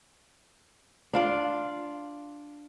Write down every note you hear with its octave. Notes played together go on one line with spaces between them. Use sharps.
D4 F4 D5